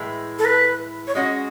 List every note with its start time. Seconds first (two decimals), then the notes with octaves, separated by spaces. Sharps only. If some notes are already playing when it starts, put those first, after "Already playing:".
Already playing: A2 E3 G#3
0.39 A4
0.45 B4
1.07 C#5
1.15 G#3 C#4 F#4 D#5